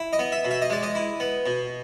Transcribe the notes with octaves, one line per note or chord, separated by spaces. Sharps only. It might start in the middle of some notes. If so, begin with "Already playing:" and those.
Already playing: E4
D#5
B3
E5
B2
E5
D#5
G#3 D5
D#5
E4
B3
B2